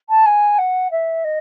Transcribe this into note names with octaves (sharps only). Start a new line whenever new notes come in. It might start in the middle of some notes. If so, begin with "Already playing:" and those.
A5
G#5
F#5
E5
D#5